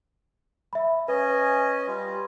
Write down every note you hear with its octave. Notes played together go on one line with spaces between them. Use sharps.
E5 B5
C#4 B4 D#5 G#5
G3 F4